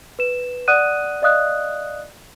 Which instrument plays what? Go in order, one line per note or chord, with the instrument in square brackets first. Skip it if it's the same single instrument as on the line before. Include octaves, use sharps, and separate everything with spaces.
[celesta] B4 E7
D5 F#5 D#6 F#6 D#7
D5 D#5 F5 D#6 F#6